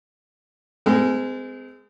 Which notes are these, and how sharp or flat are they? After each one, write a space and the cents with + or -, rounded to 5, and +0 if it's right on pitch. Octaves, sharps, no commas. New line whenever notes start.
G#3 +0 C4 -35 A4 +45